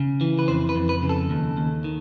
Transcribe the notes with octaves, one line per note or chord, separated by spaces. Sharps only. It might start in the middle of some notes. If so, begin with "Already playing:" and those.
Already playing: C#3
E3
B4
F2 C5
B4
F2
B4
C#3
A4
D#2
D#2
D#3